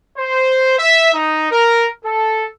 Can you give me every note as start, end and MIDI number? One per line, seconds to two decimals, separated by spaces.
0.17 0.77 72
0.78 1.11 76
1.13 1.48 63
1.51 1.85 70
2.05 2.44 69